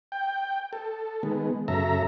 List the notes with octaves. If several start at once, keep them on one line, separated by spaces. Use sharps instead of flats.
G5
A4
D#3 G#3 B3
F#2 C#3 A4 E5 A#5